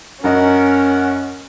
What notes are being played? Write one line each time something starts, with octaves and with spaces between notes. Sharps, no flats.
F#2 C#4 A#4 D#5 F#5